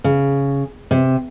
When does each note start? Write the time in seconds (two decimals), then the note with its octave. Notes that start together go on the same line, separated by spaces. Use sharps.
0.04 C#3
0.91 C3